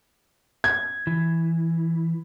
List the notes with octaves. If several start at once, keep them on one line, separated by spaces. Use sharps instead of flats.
G#6
E3